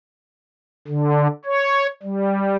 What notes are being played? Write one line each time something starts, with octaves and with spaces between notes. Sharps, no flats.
D3
C#5
G3